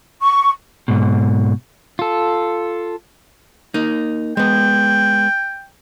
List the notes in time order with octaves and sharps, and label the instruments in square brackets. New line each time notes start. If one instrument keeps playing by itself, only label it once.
[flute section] C#6
[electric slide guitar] G#2 B2
[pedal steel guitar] F4 A4
[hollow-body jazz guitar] A#3 D#4
[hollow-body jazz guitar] G#3 B3 [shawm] G5